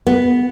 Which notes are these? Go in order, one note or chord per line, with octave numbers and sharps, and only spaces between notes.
B3